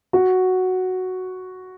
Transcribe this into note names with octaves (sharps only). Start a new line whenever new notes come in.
F#4